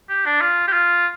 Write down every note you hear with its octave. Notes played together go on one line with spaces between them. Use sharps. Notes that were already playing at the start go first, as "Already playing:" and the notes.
G4
D4
F4
G4
F4